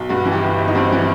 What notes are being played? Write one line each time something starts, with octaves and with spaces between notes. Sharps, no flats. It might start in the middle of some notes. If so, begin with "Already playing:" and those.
Already playing: B1
G2 F#4
E3
G4
G1
G1
D#4
G2 C4
E3